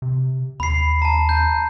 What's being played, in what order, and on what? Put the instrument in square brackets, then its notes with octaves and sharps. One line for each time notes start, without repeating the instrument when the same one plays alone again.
[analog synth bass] C3
[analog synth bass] D#2 [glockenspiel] B5 C7
[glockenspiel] A5 A#5
G6